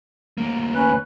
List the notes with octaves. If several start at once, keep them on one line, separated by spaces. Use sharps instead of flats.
D2 A#3
C#4 B4 F#6